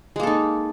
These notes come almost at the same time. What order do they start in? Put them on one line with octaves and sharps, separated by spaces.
G#3 A#3 A4 D#4